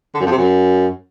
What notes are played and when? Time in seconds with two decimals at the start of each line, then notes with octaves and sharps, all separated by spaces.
0.15 D3
0.20 F#2
0.26 F2
0.31 C3
0.37 F#2